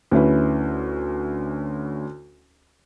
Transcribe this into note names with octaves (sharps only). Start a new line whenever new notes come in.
D2 C#4 E4 B4